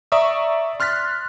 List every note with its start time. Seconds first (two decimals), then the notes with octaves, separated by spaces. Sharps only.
0.12 D5 E5 A#5 C#6 D#6
0.80 C6 F6 F#6 A6 B6